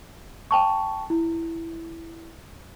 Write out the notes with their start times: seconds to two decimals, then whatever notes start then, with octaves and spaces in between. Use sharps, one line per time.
0.51 G5 A5 C#6
1.10 E4